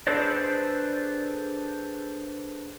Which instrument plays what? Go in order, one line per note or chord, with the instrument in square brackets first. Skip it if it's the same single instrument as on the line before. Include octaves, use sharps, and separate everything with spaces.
[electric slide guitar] D4 G#4 A4 B4 C5 D5